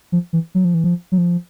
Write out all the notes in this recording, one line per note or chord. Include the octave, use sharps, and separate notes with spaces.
F3
E3
F#3
F3
E3
F3
F#3
F3